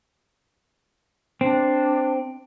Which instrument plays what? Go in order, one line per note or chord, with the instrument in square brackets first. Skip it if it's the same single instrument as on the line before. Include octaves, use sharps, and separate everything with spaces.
[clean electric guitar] C4 [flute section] D4